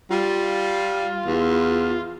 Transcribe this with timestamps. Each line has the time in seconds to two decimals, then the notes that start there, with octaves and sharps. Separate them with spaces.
0.10 G3 F4
1.26 E2